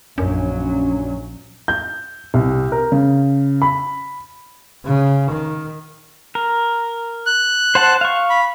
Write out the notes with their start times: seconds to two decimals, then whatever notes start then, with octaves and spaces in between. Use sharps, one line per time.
0.18 A#1 F#2 F#3 C#4 D4
1.68 G6
2.34 C2
2.72 A#4
2.92 C#3
3.62 B5
4.85 C#3
5.30 D#3
6.35 A#4
7.26 F#6
7.75 C5 F#5 A5
8.01 F5 C#6
8.30 B5